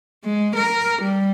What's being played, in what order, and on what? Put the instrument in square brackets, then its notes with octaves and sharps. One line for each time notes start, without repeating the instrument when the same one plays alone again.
[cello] G#3
A#4
G3